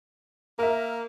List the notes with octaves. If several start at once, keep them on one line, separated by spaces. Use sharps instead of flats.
A#3 A#4 E5